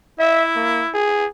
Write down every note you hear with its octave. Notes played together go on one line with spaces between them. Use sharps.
E4 E5
A#3
G#4